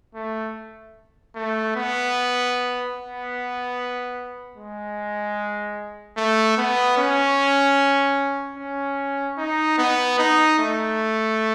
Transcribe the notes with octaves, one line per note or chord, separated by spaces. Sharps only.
A3
A3
B3
B3
G#3
A3
B3
C#4
C#4
D#4
B3
D#4
A3